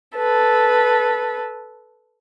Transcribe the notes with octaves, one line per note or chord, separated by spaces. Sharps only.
A4 B4